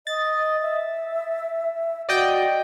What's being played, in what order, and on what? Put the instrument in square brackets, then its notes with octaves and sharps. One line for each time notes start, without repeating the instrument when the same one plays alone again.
[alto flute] D#5 [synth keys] A6
[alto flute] E5
[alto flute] F#4 [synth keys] D5 D#5 G5